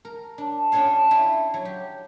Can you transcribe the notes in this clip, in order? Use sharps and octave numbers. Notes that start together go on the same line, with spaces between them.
A#4
D4
C#4 D4 F4 A4 C#5 F5
E4 C6
F#3
G4